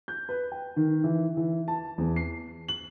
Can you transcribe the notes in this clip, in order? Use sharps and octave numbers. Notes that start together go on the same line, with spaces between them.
G6
B4
G5
D#3
E3
E3
A5
E2
C7
F#7